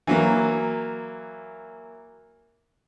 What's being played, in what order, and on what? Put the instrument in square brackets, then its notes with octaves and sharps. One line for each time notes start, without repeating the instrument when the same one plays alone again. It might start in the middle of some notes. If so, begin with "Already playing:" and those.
[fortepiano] E3 F#3 A#3